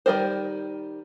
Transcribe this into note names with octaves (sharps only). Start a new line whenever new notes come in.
D#3 G3 C4 A#4 C5